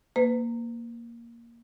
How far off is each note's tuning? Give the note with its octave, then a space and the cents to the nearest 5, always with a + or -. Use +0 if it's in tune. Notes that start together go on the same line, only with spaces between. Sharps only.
A#3 +0 B4 +35